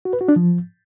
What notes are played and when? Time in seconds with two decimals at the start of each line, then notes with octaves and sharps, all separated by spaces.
0.05 F#4
0.13 B4
0.21 F#4
0.28 D4
0.36 F3